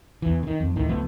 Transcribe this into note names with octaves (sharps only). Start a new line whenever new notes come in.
E2 E3
D3 D#3
F2
D2 A2 D#3
C#2 F3 A3 B3